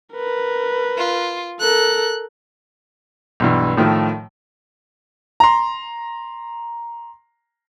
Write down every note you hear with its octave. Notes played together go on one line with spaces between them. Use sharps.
A#4 B4
F4
A4 A#4 F#6
B1 G2 E3
A2 D#3 F3 A3
A#5 C6